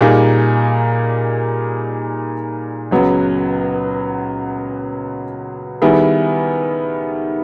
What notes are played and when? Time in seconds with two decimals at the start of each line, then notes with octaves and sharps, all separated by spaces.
0.01 A#2 G3 A#3 D#4 G#4
2.91 C#2 C#3 F#3 B3
5.82 D#3 G3 B3 E4 G#4